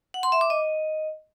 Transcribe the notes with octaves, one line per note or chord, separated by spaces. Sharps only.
F#5
C6
E5
D6
D#5